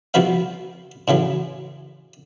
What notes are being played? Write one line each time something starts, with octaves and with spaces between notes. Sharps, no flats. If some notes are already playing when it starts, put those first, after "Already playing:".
C2 C3 F3 F#4 B4 F5
A2 C#3 E3 F#3